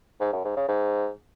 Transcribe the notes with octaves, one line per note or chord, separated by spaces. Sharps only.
G#2
F#2
G#2
C#3
G#2